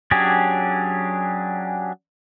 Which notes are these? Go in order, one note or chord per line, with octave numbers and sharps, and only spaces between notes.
F#3 C#4 D4 G4 G#4